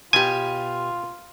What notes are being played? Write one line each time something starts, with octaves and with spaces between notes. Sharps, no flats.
B2 F4 G4 G#5